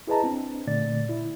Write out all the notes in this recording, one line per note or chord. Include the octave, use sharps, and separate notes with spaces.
E4 G#4 B4 D#5 A5 A#5
C4 D4
A#2 D3 A3 D5 A6
E4